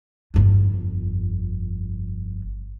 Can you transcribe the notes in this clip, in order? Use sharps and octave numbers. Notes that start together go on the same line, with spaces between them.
G1 F2